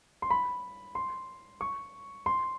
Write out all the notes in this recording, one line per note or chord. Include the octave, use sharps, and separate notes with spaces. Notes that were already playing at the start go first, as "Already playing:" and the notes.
C6
B5
C6
C#6
C6